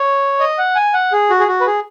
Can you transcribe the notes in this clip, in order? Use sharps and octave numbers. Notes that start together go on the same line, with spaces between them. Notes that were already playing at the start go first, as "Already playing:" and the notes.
Already playing: C#5
D#5
F#5
G#5
F#5
G#4
F#4
G#4
F#4
B4
G#4